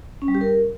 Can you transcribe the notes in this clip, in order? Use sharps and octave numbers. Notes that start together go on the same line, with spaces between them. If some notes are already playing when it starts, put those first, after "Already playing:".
C#4
G3
G4
A#4